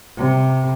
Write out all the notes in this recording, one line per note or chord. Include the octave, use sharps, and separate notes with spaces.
C3